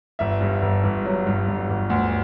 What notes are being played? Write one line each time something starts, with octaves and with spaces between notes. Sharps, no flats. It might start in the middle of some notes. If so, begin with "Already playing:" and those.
G1 E5
G2
G1
G1
F#3
G2
G1
G1
D2